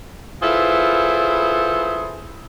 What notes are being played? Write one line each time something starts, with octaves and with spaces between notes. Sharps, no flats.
E4 F4 G#4 A4 B4 C5